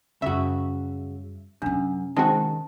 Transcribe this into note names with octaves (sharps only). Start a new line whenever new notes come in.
F#2 C#3 G3 F#4 E5
F#2 C3 C#4 D4
D#3 G#3 C4 F#4 A5